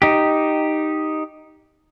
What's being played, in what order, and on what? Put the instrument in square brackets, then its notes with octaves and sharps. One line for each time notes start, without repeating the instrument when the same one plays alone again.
[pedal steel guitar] D#4 G4